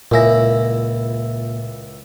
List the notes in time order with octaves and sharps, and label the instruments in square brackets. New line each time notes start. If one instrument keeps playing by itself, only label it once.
[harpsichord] C#2 E4 [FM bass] A#2 [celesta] A#4 G#5 A#6